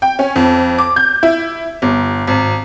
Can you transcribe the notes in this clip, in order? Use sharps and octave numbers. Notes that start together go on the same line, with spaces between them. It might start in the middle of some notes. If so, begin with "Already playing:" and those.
G5
C#4
F2
D6
G6
E4
G1
G#1